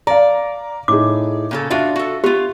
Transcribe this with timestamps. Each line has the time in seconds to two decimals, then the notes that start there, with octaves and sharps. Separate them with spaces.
0.07 D5 F5 A#5
0.88 A2 D#4 G#4 D6
1.51 A#2 C#3 A4
1.70 D4 F4 F#4 E5 F5
1.96 F#4 A4
2.24 B3 F4 G4